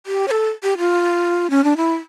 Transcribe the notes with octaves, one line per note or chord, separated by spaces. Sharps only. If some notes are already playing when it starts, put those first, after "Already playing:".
G4
C#5
A4
G4
F4
C#4
D4
E4